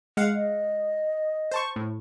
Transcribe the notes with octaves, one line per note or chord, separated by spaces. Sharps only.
G#3 F5 F#5
D#5
C5 A5 C#6
A2